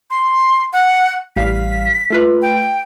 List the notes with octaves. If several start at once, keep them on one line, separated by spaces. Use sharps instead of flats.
C6
F#5
A1 G3 F5 B6
A3 F4 B4
G5